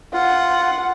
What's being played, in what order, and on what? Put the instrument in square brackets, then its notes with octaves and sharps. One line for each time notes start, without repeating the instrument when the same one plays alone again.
[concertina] F4 [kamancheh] F#5